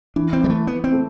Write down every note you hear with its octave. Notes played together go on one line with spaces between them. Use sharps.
E3 D4
C4
E3 G3
A3
E3 B3
C4
A3